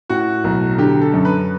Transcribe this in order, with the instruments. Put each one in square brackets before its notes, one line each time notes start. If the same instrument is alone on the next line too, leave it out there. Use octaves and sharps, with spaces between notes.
[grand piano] A2 [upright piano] F#4
[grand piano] B1
[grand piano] D3 [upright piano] G4
[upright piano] A4
[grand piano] F#2
[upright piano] B4